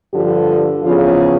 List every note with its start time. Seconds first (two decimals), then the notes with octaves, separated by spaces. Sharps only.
0.12 G2 D3 F3 G4
0.83 E2 C#3 F3 F4